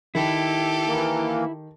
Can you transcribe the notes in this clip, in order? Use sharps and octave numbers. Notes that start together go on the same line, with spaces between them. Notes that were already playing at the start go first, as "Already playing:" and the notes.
D#3 E4 G4 A4
E3 A#3